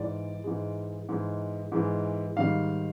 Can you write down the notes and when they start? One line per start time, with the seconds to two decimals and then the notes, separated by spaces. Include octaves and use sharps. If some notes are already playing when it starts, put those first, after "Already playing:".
Already playing: G#2 E3 G#3 D5
0.44 G#2 E3 G#3
1.09 G#2 E3 G#3
1.72 G#2 E3 G#3
2.36 G#2 D#3 G3 F5